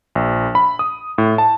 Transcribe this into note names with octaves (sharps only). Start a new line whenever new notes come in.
A#1
B5
D#6
A2
A5